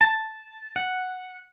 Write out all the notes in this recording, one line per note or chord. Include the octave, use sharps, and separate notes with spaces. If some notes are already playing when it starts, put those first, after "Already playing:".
A5
F#5